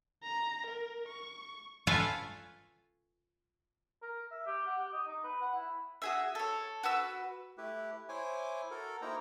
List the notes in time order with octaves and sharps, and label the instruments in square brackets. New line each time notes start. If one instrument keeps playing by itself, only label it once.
[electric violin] A#5
A#4
C#6
[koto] F4 A4 B4 C#5 F5 G#5
[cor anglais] A#4
E5
G4
F#5
G4
D#5
D#4
B4
F#5
E4
[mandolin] F#4 G#4 E5
A4 C#5
F#4 B4 E6
[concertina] A3 E4 G4 B4
E4 C5 C#5 G#5 D6
F#4 A4 A#4
A#3 D#4 E4 C5 G5 A#5